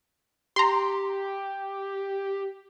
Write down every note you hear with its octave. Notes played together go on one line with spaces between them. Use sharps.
G4 A#5 C6